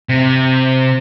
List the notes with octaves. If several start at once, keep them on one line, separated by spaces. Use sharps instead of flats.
C3